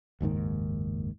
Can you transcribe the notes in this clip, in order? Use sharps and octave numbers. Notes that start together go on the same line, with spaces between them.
F#1 D#2 G#2 D#3